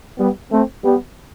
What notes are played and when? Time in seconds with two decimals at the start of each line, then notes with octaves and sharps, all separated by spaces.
0.18 G3 B3
0.51 A3 C4
0.84 G3 B3